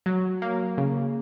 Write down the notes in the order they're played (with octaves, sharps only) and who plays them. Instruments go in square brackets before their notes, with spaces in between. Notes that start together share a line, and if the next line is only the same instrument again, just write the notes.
[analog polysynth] F#3
A#3
C#3